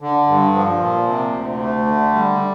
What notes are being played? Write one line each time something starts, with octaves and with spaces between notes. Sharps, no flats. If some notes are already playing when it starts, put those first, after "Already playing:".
D3
G2
F3
A#2
C3
D2
A3
D3
G3